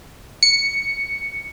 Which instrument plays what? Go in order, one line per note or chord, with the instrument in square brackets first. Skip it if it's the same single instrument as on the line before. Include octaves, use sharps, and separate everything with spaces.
[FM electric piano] C#7